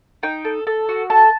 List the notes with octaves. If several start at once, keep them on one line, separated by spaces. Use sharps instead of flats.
D#4 G5
A4
A4
F#4
A4 A5